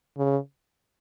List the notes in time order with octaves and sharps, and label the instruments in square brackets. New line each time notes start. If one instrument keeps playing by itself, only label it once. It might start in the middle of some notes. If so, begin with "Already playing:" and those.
[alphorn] C#3